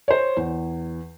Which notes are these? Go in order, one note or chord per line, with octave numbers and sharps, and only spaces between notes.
C5 C#5
E2